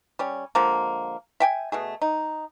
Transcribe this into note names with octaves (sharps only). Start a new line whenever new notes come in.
G3 C#4
D3 F3 G#3 A#3
E5 G5 G#5
B2 A3 G#4
D#4